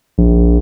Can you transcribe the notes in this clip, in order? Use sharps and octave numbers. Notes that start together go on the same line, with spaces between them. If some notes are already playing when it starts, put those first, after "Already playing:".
A#1